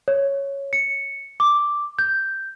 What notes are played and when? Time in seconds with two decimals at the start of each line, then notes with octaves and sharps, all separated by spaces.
0.08 C#5
0.73 C#7
1.40 D6
1.99 G6